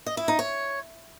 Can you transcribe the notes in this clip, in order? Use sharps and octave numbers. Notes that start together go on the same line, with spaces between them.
D#5
E4
D#4
C#5